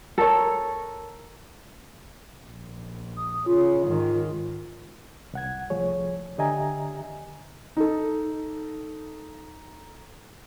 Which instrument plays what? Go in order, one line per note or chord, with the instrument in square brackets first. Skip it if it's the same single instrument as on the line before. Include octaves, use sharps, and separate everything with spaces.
[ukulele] A4 A#4 C#5
[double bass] A#1
[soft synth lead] D#6
[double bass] C#3 [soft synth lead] F4
[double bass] G#2 D#3
[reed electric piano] C2 F#5 G#6
C2 F3 A3 G#4 C#5
D3 G4 D#5 E5 G#5 A#5
[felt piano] D#4 A4